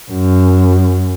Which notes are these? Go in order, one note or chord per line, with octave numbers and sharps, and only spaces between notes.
F#2